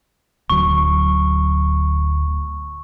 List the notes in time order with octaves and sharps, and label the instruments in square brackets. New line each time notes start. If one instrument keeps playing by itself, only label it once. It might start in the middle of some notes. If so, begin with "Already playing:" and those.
[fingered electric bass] D1 D2 F#3 [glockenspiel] C#6